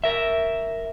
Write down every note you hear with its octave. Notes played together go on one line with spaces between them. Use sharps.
A#4 E5